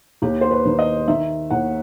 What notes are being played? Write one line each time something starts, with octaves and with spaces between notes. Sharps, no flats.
D#2 G4
C5
B4
D#3
D#5
D#3 E5
D#2 F#5